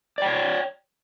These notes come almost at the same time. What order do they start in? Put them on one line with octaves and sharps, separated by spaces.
D5 G5 C#5